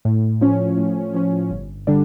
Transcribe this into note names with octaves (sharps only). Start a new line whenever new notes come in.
A2
F3 C#4
A2
F3 C#4
G1
D3 G3 D4